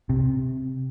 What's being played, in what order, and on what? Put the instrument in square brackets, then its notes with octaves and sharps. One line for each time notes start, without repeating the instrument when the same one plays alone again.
[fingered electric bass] C3